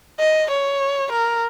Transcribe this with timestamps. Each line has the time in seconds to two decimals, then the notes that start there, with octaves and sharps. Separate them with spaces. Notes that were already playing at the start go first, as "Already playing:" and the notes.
0.20 D#5
0.50 C#5
1.12 A#4